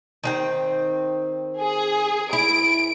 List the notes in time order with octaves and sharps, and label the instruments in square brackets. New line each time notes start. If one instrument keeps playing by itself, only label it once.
[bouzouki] D#3 C4 G5
[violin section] G#4
[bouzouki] E4 [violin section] D7